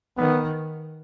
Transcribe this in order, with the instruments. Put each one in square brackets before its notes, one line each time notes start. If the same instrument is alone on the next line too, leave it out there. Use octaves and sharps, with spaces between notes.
[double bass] D#3 [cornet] B3